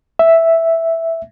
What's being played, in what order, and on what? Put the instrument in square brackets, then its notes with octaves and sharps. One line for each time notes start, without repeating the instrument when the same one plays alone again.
[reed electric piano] E5